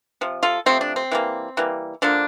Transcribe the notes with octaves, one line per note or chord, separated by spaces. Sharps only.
C3 F3
F4 A4
C3 F3 A3 C4
D4
C4
E3 G3 A#3
E3 G3 A#3
D3 F3 A#3 D4